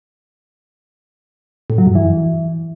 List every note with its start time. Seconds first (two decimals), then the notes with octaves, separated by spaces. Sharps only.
1.70 A2
1.78 F#3
1.87 F#2
1.95 E3